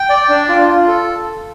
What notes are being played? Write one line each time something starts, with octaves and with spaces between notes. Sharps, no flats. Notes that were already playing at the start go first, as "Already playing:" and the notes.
Already playing: G5
D5
D4
F4
F4
A4